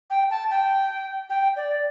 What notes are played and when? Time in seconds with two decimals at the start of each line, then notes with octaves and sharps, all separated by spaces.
0.10 G5
0.30 A5
0.50 G5
1.30 G5
1.56 D5